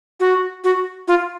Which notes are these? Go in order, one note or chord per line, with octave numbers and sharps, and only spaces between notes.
F#4
F#4
F4